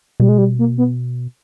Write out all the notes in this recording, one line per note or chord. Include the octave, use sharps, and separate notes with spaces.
B2 G3
G#3
G3
A#3
B3